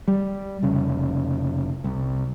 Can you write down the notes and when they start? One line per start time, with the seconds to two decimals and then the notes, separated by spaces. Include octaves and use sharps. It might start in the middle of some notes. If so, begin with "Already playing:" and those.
0.08 G3
0.63 F1 C#3
1.84 C2